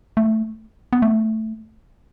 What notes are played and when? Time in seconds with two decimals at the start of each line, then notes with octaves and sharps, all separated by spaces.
0.17 A3
0.93 B3
1.02 A3